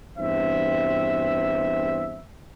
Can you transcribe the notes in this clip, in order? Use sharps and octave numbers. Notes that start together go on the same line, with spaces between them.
E2 G2 C4 E5